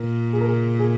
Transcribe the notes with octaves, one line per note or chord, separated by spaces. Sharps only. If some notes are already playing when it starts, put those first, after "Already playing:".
Already playing: A#2 A#4
G#4
A#4
G#4
G#4